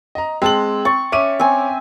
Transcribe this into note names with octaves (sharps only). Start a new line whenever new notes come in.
D#5 A#5
G#3 C4 A5 F#7
C#6 A6
C#4 E5 D6 D#7
C4 G#5